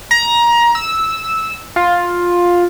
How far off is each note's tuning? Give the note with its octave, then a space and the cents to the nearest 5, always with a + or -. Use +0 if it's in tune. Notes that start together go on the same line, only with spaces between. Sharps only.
A#5 +20
E6 -10
F4 +10